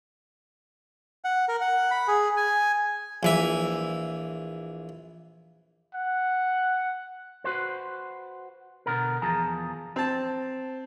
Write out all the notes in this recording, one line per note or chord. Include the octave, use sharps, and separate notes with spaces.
F#5
A#4
F#5
B5
G#4
G#5
A#1 E3 E5
F#5
F#4 B4 C5
B2 D3 B3 A#4
E2 F3 G#4 A5 A#5
C4 A5